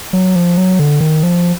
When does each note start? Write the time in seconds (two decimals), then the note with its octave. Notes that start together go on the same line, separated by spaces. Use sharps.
0.13 F#3
0.36 F3
0.58 F#3
0.79 D3
1.01 D#3
1.23 F3